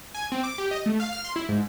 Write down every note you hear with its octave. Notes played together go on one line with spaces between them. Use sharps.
G#5
C4
D6
G4
D#5
A3
F5
F6
C6
E4
G#2